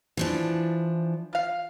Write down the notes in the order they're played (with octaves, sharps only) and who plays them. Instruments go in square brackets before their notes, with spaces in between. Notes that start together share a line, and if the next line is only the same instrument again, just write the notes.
[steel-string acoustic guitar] E3 F3 D4
[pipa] F4 F5